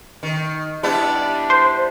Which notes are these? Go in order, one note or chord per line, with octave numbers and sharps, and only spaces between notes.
D#3
G3 B3 D4 E4
C5